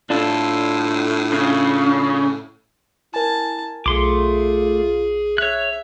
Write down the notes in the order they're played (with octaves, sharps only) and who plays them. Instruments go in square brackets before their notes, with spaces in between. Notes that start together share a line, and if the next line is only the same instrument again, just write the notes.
[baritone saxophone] A2 [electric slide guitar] D4 F4 A4
[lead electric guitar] C#3
[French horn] E4 [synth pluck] A#4 G#5 [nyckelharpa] A5
[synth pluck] B1 [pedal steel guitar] A3 C6 D6 [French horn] F4 [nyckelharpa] G#4
[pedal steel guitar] C#5 F#6 [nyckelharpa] E5